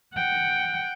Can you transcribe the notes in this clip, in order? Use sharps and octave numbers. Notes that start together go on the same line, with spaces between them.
F#5 G5